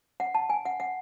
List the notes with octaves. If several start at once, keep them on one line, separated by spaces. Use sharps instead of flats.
F#5
A5
G#5
F#5
F#5